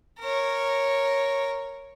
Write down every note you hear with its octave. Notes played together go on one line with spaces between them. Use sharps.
A#4 C#5